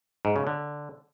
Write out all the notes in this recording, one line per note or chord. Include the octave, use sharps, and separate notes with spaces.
G#2
C#3
D3